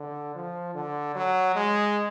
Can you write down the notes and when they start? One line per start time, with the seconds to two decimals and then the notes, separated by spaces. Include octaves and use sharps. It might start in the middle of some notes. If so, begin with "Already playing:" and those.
Already playing: D3
0.35 F3
0.74 D3
1.15 F#3
1.55 G#3